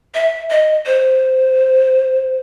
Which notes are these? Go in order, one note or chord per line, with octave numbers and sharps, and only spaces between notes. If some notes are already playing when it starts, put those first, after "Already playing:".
E5
D#5
C5